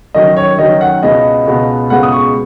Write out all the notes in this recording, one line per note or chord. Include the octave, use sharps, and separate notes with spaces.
F#2 D#3 F#3 D#5
C#5
F#2 D#3 F#3 D#5
F#5
C#2 B2 B3 D#5
C#2 B2 B3
C#2 B2 G#3 B3 F#5
D#6
C#6